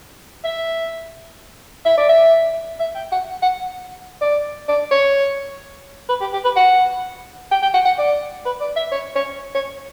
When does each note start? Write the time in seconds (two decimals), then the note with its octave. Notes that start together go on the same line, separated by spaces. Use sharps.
0.44 E5
1.86 E5
1.98 D5
2.09 E5
2.80 E5
2.95 G5
3.12 F#5
3.42 F#5
4.21 D5
4.68 D5
4.91 C#5
6.09 B4
6.21 G4
6.33 G4
6.44 B4
6.56 F#5
7.51 G5
7.62 G5
7.74 F#5
7.85 F#5
7.98 D5
8.45 B4
8.60 D5
8.76 E5
8.92 C#5
9.16 C#5
9.55 C#5